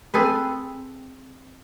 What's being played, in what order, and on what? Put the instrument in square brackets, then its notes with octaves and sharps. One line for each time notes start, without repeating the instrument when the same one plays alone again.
[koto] C4 G#4 A4 B4